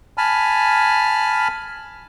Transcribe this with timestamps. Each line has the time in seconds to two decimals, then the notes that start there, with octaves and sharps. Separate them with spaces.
0.18 G#5 A5 B5 F6